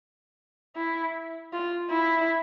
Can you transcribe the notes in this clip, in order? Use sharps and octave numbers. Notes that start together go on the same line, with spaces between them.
E4
F4
E4